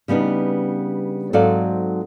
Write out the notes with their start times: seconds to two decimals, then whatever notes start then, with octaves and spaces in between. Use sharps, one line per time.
0.08 C#3 G3 B3 D4 D#4
1.33 G#2 F#3 C4 A4 D5 F5